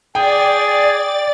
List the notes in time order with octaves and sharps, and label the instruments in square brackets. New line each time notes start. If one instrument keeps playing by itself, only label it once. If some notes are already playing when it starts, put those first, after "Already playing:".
[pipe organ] G#4 [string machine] D5 A6 [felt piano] G5